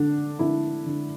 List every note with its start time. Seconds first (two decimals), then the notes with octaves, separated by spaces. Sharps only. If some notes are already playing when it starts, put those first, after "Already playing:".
Already playing: D3 D4
0.39 D3 E4
0.86 D3